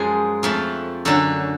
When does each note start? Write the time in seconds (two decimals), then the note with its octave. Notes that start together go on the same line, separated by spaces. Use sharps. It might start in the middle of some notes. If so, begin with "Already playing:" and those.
Already playing: F#2 F3 G#3 G#4
0.43 F2 F3 A3
1.05 F#2 D3 F#3 A4